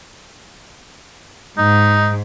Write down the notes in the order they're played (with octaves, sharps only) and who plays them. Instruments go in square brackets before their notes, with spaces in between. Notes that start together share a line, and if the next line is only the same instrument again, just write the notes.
[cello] G#2 [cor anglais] D#4